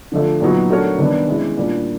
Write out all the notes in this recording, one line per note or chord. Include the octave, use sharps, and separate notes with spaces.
D3 F3 A3
A#2 F#3 B3 D#4 F#4
A3 D4 F#4 A#4 C#5
C3 D#3 G3 B3 D4
G#3 C#4 E4
A#2 G3 A#3 D4